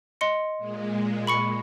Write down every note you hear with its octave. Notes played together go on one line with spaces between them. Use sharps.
D#5 C6 C#7
A#2 G#3
B5 C#6 C#7